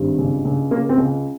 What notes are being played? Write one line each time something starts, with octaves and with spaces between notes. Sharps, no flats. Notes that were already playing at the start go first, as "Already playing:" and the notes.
Already playing: G#1 G2
C#2
C#2
C#3 A#3
C4
C#2